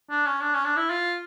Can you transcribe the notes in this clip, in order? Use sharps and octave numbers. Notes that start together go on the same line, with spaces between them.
D4
C#4
D4
C#4
D4
E4
F4